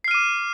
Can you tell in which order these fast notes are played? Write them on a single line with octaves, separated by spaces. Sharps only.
C7 F6 D#7 D6